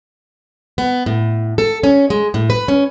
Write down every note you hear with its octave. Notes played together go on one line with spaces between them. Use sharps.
B3
A2
A4
C#4
G#3
A2
B4
C#4